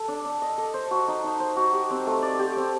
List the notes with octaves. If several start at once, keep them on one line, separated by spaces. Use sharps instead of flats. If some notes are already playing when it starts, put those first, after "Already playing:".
Already playing: A4
D4
D4
D#5
A4
C5
F#4
D#4
D#4
C5
F#4
G4
C4
A3
D5
G4
C4